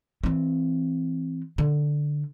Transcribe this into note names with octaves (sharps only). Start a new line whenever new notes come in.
E3 C4
D3